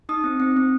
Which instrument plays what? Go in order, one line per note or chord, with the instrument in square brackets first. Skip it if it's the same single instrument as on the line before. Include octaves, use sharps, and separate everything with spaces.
[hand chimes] D#4 D#6
C4
C4
C4